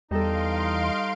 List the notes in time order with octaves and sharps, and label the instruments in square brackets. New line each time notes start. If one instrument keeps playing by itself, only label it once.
[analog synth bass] E2 [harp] G3 A4 [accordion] D#4 D#5 [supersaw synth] F5 C6 D7